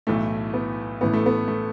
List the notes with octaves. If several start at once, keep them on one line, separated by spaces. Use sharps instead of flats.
B1 A2 E3 A3
B3
A1 A2 E3 B3
A3
B3
A3